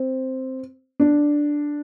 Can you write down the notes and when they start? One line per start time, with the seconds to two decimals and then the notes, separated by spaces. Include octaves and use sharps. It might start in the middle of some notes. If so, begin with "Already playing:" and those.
Already playing: C4
1.00 D4